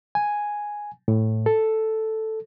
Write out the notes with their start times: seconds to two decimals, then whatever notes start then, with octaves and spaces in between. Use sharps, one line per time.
0.15 G#5
1.08 A2
1.46 A4